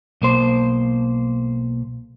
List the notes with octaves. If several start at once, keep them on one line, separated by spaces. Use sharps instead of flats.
B1 A#3 C5